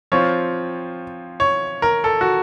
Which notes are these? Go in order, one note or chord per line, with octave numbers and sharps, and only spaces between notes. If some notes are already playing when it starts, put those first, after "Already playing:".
F3 C4 F4 C#5
C#5
A#4
A4
F#4